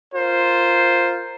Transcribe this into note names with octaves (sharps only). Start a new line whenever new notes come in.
F4 A#4 C5